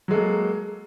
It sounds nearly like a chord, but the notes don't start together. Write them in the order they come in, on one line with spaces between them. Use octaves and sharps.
F#3 G#3 A4 A#3